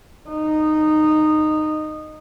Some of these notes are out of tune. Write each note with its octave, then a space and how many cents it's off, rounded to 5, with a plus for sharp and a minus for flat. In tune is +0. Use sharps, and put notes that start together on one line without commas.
D#4 -15